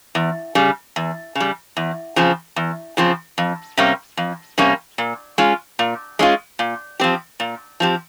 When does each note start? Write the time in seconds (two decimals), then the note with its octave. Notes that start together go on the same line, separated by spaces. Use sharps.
0.15 E2
0.55 C#3 G3
0.96 E2
1.35 C#3 G3
1.77 E2
2.16 C#3 F3 C4
2.56 E2
2.97 C#3 F3 C4
3.38 F2
3.77 C3 G3 A#3 C#4
4.17 F2
4.58 C3 G3 A#3 C#4
4.98 A#2
5.38 G#3 C#4 F4
5.79 A#2
6.19 G#3 C#4 F4
6.59 A#2
7.00 F3 C4 G4
7.40 A#2
7.80 F3 C4 G4